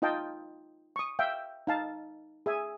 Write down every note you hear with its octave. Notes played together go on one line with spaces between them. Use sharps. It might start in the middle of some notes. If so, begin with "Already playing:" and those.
D#4 F4 D#5 F5 G5 A5
C#6 D#6
E5 F5 G5
D#4 F5 A5
G#4 E5 G#5